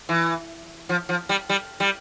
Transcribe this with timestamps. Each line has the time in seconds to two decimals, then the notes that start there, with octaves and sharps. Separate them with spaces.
0.09 E3
0.89 F3
1.09 F3
1.29 G3
1.49 G3
1.80 G3